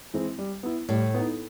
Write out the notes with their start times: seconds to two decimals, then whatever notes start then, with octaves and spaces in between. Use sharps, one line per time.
0.14 E3 G#3 C4 E4
0.38 G3
0.63 B3 E4
0.89 A2 G3
1.14 B3 D#4